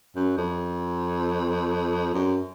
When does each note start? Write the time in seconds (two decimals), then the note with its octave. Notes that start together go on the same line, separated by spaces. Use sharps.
0.16 F#2
0.37 F2
2.14 F#2